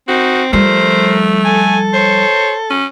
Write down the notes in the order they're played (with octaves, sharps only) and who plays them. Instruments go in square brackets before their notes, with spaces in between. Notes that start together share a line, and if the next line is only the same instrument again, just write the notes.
[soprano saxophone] C4 [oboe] D#4 [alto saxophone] F#4
[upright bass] F3 G3 [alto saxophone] A3 [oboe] A#4 [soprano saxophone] C5
[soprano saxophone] A4 [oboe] G#5
[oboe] C5 [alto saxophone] C#5
[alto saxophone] C#4